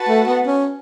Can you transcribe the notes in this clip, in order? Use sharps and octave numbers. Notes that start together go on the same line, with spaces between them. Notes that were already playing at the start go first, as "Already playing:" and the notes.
Already playing: F#4 B4 F#5 A5
A3
B3
C#4